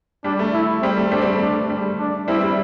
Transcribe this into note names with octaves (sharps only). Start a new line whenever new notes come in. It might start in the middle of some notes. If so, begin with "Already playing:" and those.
G3 D4
A3
E4
G3 C4
A3
G3 C4 D4
G3 C4
A3
D4
G3
D4
G3 C4 E4
G3